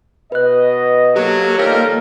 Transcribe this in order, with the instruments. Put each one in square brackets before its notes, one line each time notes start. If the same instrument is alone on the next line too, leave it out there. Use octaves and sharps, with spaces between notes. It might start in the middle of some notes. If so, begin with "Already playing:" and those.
[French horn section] B2 D#5 [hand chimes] B4 F#6
[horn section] F#3 [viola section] A#3 A4 [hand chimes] G4
[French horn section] D#3 F3 [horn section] G3 F4 A#4 [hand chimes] C#5